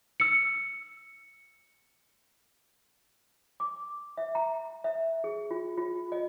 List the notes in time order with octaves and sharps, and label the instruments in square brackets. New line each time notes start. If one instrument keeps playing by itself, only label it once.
[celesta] E6 C#7
[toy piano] D6
E5
A#5
E5
G#4
F4
F4
D#5